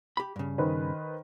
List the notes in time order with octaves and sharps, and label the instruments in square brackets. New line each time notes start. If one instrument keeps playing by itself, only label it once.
[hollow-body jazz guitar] G4 B5
G2 C#3
[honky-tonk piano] D#3 B4 C5